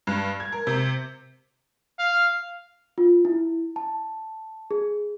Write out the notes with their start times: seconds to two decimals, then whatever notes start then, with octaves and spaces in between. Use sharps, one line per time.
0.07 G2
0.40 G#6
0.52 A#4
0.67 C3
1.99 F5
2.98 F4
3.25 E4
3.76 A5
4.71 G#4